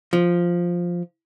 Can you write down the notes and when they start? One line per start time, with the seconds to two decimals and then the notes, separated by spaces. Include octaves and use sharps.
0.13 F3